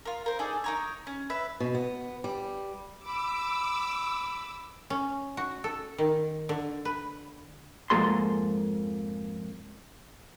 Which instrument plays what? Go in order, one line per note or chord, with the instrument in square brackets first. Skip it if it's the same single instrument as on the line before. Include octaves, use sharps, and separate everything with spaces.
[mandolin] F4 A#4
A#4 C5
D#4 G#4 A4 D5
D#4 A#4 C#5
C#4
B4 E5
[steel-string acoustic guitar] B2
B3
G3
[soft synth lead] B5 [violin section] D6 E6
[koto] C#4
F#4
A4
D#3
D3
B4
[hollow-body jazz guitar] F2 G#2 F3 A#3 A4 C6